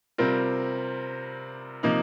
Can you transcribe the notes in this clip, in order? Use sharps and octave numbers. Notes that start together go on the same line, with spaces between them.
C3 G3 C4 F4 A#4
C3 F3 A#3 D#4